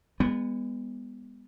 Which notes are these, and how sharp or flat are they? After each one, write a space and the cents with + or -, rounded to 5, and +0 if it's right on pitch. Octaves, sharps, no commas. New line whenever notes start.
G#3 -35 B3 +0